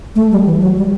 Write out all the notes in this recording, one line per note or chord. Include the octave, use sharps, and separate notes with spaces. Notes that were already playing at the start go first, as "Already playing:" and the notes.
A3
G3
E3
F#3
G3